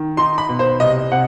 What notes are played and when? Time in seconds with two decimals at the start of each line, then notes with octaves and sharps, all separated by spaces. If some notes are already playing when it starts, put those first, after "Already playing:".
Already playing: D#3
0.17 D#4 C6
0.38 B5
0.49 B2
0.59 C5
0.80 C2 D#5
1.11 C3 F#5